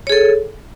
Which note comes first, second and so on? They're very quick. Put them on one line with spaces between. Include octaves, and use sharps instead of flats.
C#5 G#4 A4